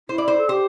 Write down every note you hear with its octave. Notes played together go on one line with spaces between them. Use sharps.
E4 C5
D5
C5
A4
G4 C5